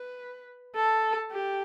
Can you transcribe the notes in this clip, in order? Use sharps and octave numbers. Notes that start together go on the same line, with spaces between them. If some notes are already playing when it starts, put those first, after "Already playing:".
Already playing: B4
A4
G4